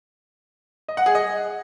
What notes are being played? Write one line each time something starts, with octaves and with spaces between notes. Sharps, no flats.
D#5
F#5
G#4
D#5